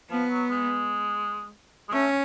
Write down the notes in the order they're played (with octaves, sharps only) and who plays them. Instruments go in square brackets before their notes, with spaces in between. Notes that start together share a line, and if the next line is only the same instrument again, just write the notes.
[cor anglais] F3 [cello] B3
[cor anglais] F#3
G#3
G#3
[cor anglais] A3 [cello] C#4